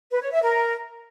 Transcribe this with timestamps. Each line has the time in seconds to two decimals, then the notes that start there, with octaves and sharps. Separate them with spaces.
0.11 B4
0.21 C#5
0.32 E5
0.42 A#4